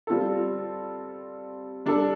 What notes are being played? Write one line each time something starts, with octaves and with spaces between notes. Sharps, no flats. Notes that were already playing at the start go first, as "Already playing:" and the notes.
G3 C4 F4 A4
G3 D4 A4